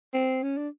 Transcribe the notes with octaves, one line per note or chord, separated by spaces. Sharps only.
C4
C#4
D4